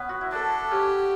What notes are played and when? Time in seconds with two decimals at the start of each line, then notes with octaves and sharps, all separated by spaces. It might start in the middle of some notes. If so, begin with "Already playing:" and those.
Already playing: B3 C#4
0.09 F#4
0.21 E4
0.32 D4 A4
0.71 C#4 G4